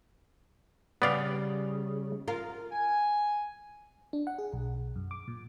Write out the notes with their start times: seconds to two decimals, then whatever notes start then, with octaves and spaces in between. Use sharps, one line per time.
1.02 C#3 G3 B3 D5 F5
2.28 F4 A#4
2.72 G#5
4.13 D4
4.27 F#5
4.38 G#4
4.53 B1
4.96 F#2
5.11 D6
5.28 A#2